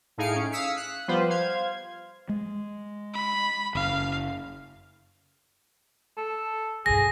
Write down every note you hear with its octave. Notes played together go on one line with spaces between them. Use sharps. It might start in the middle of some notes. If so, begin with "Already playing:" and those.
A2 D#4 G#4 F5 C#7 D7
C#4
F5 D#6 E6 B6 C#7
F#6
F3 G3 B3 F4 B4 C5
C5 F5 G#6
G#3
B5
F#1 F5
A4
B1 G2 G#4 A#6